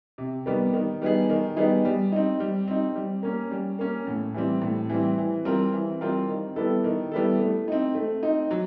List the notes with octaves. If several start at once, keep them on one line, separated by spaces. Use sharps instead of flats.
C3
D#3 G3 B3
D#3
G3 B3 D#4 G#4
D#3
G3 B3 D#4 G#4
G3
C4 D#4
G3
C4 D#4
G3
A#3 C#4
G3
A#3 C#4
A2
E3 G3 C4
A2
E3 G3 C4
E3
G3 C4 F4 A#4
E3
G3 C4 F4 A#4
D#3
G3 B3 E4 A4
D#3
G3 B3 E4 A4
A3
C4 D#4
A3
C4 D#4
F#3